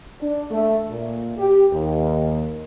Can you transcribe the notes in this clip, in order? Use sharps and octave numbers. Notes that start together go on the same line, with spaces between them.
D4
A3
A#2
G4
D#2